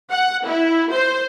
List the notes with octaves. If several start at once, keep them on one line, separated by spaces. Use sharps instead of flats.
F#5
E4
C5